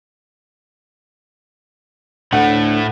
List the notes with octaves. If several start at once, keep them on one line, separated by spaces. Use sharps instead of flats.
D2 A2 A3 F#5